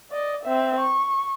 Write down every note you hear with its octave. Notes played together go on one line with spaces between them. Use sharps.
D5 D#5
C4 E5
C#6